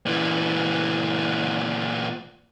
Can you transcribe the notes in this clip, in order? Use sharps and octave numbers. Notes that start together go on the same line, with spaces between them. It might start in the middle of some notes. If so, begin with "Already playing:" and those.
A#2 E3